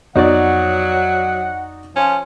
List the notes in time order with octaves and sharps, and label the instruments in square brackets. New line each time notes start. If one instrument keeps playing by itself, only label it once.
[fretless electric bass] F2 B3 [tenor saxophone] F#3 [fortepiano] D#4 F#4 D5 [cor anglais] F#5
[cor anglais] F3 [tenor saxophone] C#4